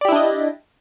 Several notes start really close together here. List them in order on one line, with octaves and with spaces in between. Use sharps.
D5 G4 E4 D4 D#5